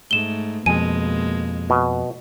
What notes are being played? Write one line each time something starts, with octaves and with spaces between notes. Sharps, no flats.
G#2 A3 E7 G7
F2 B2 G#3 A#3 G#5 D#7
B2